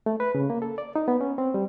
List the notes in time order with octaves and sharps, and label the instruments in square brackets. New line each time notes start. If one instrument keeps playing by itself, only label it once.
[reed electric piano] A3
B4
C#3
A#3
A4
D5
D#4
B3
C#4
C4
G3